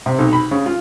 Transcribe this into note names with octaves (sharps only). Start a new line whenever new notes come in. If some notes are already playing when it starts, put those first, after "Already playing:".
C3
B1
B5
C#3
F4